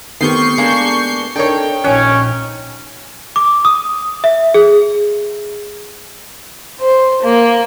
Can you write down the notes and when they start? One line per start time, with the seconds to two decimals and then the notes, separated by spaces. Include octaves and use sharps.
0.21 D#3 A3 B3 C4 G4 C#6 G6 C7
0.58 G#3 A#3 D4
1.36 D4 D#4 A4 A#4 C#5 G5
1.84 A#1 C#4 D#4 C#5 F#6
3.36 D6
3.65 D#6
4.24 E5
4.54 G#4
6.80 C5
7.22 A#3